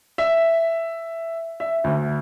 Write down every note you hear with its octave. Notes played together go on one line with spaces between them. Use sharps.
E5
E5
D2